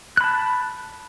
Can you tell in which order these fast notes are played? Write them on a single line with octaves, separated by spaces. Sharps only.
F#6 B5 A5